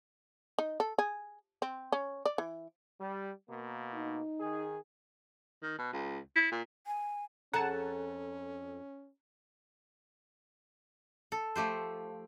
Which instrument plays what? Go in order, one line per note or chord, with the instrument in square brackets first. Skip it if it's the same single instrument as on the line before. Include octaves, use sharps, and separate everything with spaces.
[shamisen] D#4
A4
G#4
C4
C#4
D5
E3
[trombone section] G3
B2 A#3
[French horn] D#4
[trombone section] D#3 G#4
[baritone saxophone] D#3
B2
C#2
E4
A#2
[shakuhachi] G#5
[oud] F2 G#4 A4 [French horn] C#4 [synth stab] F#5 A5 [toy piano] A#5
[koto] A4
F3 A3 G4 C5